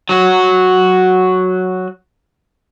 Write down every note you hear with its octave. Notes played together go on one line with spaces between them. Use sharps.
F#3 F#4